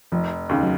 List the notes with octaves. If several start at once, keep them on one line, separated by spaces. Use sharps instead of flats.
F1 F3
D#2 C#3
F#3